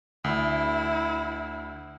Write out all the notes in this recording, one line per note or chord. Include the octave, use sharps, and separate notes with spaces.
D2 E4